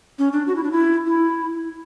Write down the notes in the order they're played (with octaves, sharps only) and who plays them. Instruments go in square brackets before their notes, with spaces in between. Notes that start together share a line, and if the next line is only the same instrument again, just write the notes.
[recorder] C#4
D4
F#4
E4
D4
E4
E4